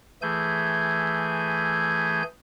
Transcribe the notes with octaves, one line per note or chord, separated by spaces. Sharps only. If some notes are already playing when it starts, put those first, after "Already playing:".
E3 A3 G#4 G#5 G6